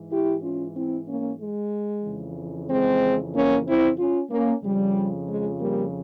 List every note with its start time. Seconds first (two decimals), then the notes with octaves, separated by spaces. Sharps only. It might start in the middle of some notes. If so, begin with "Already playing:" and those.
Already playing: G#2 E3
0.11 E4 G4
0.43 C#4 F4
0.75 C4 E4
1.08 A#3 C#4
1.40 G#3
2.04 F2 C#3 E3
2.69 G#3 C4
3.33 A#3 C#4
3.66 C4 E4
3.98 C#4 F4
4.30 A#3 C#4
4.63 F2 C#3 F3 G3
5.28 G#3
5.60 G3 A#3